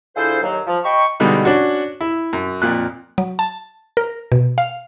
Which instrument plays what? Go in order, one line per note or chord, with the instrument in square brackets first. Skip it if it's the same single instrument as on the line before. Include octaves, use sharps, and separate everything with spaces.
[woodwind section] D3 E4 F4 G#4 A4 C5
D#2 F#3
F3
D#5 G5 A5 B5 C#6
[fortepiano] B2 D3 G3 G#3 D#4
C#4 D4 F#4
E4
F#2
F2 A#2 F#6
[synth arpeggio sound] F#3
A5
A#4
B2
F5